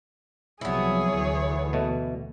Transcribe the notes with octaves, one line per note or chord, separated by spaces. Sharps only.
C2 F3 F#3 B3 E4 G#4 C#5
D2 E3
B2 A3